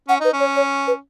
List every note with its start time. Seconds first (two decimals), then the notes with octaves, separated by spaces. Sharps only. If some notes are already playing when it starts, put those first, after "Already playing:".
0.09 C#4 F#5
0.21 D#4 B4
0.33 C#4
0.40 C#5
0.56 C#5
0.87 B4